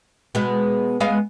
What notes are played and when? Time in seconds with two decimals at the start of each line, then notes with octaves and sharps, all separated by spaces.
0.35 B2 G#3 B3
1.00 G#3 B3 F5